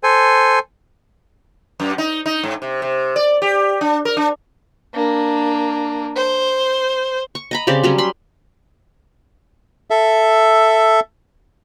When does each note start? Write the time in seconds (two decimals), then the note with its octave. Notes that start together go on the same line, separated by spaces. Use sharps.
0.03 A4 C5 G#5
1.80 F#2
1.98 D#4
2.26 D#4
2.43 G#2
2.62 C3
2.82 C3
3.16 D5
3.42 G4
3.81 D4
4.05 A#4
4.17 D4
4.94 A#3 D4
6.16 C5
7.35 C#6
7.51 D#5 A#5 B5
7.67 C#3 C4 G4 D5
7.84 F#3 G3 C#4
7.98 B5 C6
9.90 A4 E5